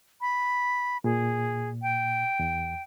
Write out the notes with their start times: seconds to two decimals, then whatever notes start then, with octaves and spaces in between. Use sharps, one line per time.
0.21 B5
1.04 A#2 G#4
1.82 G5
2.39 E2